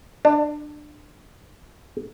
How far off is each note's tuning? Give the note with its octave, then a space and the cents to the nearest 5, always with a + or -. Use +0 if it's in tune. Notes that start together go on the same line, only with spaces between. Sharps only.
D4 +20